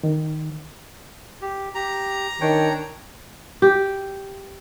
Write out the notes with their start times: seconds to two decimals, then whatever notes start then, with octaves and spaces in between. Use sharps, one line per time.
0.03 D#3
1.42 G4
1.75 G4 A#5
2.41 D#3 D4 C#5 G5
3.62 G4